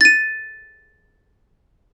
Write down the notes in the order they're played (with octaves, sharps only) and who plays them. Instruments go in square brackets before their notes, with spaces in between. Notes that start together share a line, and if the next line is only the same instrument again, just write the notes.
[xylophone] A6 D#7